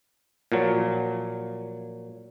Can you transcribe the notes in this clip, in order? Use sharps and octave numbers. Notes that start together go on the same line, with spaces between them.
A#2 F3 F#3